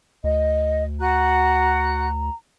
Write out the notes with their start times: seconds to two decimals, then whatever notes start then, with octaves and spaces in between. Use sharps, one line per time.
0.24 D2 D#5
1.00 F#4 F#5 A#5 F#6